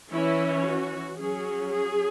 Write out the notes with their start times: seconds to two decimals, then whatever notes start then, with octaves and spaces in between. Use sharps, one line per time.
0.12 E3 C#4 E4
0.64 F#4
1.17 F#3 C#4 G#4
1.70 G#4